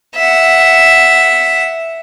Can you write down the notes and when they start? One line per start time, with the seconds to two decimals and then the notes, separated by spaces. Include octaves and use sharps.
0.16 E5 F#5